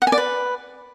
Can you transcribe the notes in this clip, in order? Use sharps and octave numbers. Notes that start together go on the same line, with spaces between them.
F#5
G#5
D5
B4